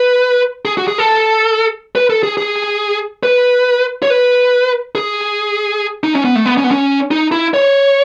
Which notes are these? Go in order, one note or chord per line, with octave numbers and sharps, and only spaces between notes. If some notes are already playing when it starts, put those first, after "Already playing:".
Already playing: B4
G#4
F#4
G#4
A4
B4
A4
G#4
G#4
B4
C#5
B4
G#4
D#4
C#4
B3
A3
B3
C#4
B3
C#4
D#4
E4
C#5